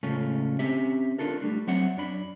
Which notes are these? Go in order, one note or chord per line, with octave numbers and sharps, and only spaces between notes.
A2 C#3 G#3 C#4 F4 A4
C4 C#4 G4 E5
D4 F4 A4 A#4
G3 A3 D4
F#3 C4 E5 F#5
F#2 D4 B5